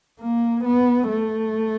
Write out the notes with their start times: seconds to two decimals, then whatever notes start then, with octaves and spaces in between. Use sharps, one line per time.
0.21 A#3
0.64 B3
1.08 A3